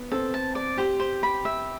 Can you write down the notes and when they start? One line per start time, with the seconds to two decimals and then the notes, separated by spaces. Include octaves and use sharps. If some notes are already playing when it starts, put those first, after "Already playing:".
Already playing: B3
0.12 C4 A4
0.34 A5
0.55 D5
0.78 G4 C5
1.00 C5
1.23 B5
1.45 E5